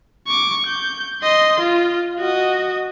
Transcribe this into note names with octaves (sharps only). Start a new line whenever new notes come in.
C#6 D6
G6
D#5 C6
F4
F#4 D#5